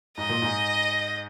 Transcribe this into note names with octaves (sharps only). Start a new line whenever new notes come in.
G#2 D#5
A#2
G#2